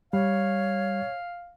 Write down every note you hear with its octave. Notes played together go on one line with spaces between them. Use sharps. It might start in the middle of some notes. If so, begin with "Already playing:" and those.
G3 C#5 F5